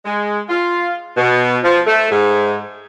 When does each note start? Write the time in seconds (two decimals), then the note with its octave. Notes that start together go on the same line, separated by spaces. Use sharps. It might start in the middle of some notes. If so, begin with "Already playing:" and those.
0.05 G#3
0.49 F4
1.17 B2
1.63 F3
1.87 A3
2.11 G#2